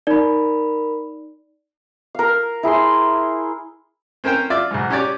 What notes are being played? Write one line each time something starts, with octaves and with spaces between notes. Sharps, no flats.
D#4 A#4 D5 B5
A#4 F5
E4 G#4 C5 C6
C4 C#4 A#4 C5 G5
F4 D5 E5
B1 G#2
C#4 G4 C#5 D5